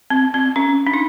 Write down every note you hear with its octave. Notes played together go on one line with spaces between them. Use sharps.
C4
C4
C#4
D4
D#4